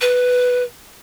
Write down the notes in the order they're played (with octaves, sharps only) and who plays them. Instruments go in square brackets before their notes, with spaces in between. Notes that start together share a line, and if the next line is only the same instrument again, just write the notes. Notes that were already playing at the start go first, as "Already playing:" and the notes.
[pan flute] B4